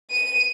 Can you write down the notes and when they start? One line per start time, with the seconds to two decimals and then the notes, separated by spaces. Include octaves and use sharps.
0.11 D#7